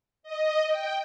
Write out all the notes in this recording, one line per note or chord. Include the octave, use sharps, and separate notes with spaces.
D#5
G5